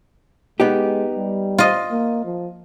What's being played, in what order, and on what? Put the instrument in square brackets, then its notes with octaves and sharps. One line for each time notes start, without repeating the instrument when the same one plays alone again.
[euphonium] G#3 [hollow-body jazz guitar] B3 D#4 G4
[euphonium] G3
[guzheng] F4 D#5
[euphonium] A#3
F3